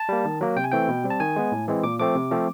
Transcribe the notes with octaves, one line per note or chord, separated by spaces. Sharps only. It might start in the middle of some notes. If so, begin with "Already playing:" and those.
Already playing: A5
G3 A#3
D#3
F#3 A#3
C3 G5
G#5
E3 A3 C4 G5
B2
G3 C4
A5
D#3 G#5
G#3 B3
A2
E3 G#3 C4
A#2 D6
F3 A3 C4 D6
C3
F3 A3 C4